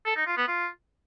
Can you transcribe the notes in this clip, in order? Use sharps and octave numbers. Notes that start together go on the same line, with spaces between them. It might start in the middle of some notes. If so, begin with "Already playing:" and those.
A4
D#4
F4
B3
F4